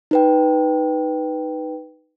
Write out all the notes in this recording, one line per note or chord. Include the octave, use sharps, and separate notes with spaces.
D#4 B4 G5